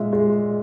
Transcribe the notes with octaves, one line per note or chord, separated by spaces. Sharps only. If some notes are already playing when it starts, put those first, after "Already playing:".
Already playing: A#2 G#3 E5
G#3